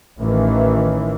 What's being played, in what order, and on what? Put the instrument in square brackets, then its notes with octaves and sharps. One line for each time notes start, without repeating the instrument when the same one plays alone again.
[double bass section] A1 D#3 E3